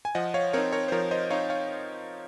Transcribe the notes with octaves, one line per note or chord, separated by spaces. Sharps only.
G#5
F3 D#5 F#5
C#5 F5
C4 D#4 A#4 C#5
A#4 C#5
C5
F3 A#4 C#5
C5 D#5
C4 D#4 C#5 F5
C#5 F5